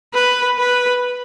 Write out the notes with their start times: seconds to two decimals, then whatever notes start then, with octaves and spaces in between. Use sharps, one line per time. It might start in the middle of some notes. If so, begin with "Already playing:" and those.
0.14 B4
0.58 B4